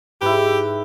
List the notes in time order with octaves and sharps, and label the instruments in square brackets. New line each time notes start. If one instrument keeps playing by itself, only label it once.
[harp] G#2 [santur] E4 B4 [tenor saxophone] G4